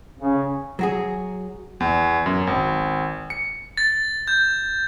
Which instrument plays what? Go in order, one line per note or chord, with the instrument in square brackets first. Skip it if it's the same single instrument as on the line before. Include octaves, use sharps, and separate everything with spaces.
[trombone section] C#3
[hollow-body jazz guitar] F#3 F#4 G#4
[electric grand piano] E2
F#2
G#1
C#7
[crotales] A6
G6